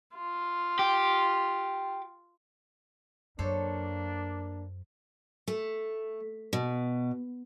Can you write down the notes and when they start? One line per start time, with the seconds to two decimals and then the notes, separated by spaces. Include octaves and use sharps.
0.16 F4
0.79 G4
3.39 F#2 A#3 D4 A4 C5 C#5
5.47 A3
6.53 B2